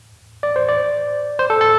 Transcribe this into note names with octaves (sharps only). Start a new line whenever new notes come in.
D5
C5
D5
C5
A4
A4